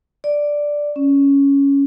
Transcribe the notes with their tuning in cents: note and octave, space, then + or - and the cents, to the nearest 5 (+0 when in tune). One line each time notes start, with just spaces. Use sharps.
D5 +0
C#4 +5